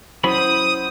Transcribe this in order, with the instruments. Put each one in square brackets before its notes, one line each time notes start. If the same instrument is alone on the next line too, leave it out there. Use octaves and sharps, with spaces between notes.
[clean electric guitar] F#3 C#4 B5 [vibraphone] E4 [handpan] C5 [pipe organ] D#6